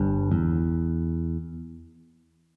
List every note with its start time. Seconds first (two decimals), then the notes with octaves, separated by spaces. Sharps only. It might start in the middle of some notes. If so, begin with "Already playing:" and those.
Already playing: G1 G2
0.32 E2